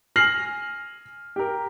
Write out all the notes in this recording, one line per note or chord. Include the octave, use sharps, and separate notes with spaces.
G#5 F6 A#6 C7 F#7
G4 A#4